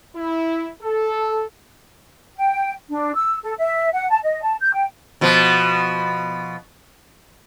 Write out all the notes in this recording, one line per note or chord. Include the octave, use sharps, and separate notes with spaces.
E4
A4
G5
D4
E6
A4
E5
F#5
A5
D#5
A5
G6
G5
B2 F3